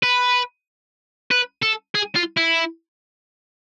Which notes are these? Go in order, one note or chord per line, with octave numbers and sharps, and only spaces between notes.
B4
B4
A4
G#4
F4
E4